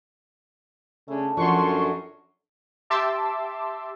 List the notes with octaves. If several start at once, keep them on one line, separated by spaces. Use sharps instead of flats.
C#3 A3 D4
F#2 D3 F3 F#5 A5 C6 C#6
G4 E5 A5 C6 D6 E6